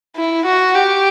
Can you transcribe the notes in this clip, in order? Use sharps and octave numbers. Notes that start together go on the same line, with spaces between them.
E4
F#4
G4